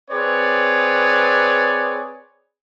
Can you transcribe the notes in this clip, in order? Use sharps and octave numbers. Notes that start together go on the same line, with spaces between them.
C4 G#4 B4 C#5 D5